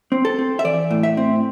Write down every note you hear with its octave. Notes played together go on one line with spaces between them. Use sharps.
C4
A4
C4
E5
E3 D5
A2
E5
C4